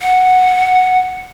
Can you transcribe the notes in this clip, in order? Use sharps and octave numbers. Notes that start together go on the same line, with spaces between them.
F#5